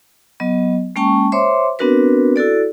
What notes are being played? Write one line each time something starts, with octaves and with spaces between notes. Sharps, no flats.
F#3 B3 D#5
G#3 A#3 C#4 G5 A5 C#6
C5 C#5 E5 C6 D6
B3 C4 D4 F#4 A#4 B4
E4 F#4 A4 D5